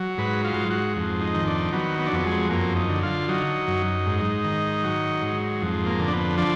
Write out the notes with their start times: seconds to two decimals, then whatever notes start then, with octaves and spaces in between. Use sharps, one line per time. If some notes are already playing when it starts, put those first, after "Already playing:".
Already playing: F#3
0.18 G#2 B4
0.44 F4
0.56 G#2
0.70 F#4
0.96 F2
1.21 D#4
1.35 D#3
1.47 D4
1.72 F#3 B3
1.99 B3
2.06 D4
2.12 F2 B3
2.25 G#3
2.50 F#2 A#3
2.76 D#4
2.89 D3
3.03 F4
3.29 F#3 D#4
3.67 F#2
4.06 G#2
4.44 D#3
4.83 F#3
5.21 G#2
5.61 F2
5.86 A#3
5.99 D3
6.08 D4
6.13 B3
6.38 F3 D4